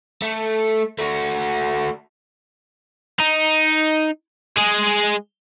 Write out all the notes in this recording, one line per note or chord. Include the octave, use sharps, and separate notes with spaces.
A3
A3 F#4
D#4
G#3 G#4